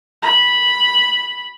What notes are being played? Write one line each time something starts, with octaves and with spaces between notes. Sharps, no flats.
B5